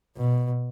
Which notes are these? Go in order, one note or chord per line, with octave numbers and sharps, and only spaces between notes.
B2